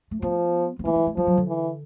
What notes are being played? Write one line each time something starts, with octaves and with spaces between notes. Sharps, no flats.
A3
F3 B3
B3
E3 A#3
G#3
G#3
F3 G3
F#3
D3
E3